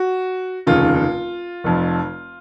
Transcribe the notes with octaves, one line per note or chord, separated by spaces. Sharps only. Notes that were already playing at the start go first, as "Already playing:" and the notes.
Already playing: F#4
F1 D#2 C#3 F4
F1 F2 F3